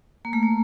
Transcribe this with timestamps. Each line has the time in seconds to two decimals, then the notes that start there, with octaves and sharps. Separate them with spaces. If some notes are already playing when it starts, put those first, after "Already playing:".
0.25 A#3
0.33 A3
0.43 A#3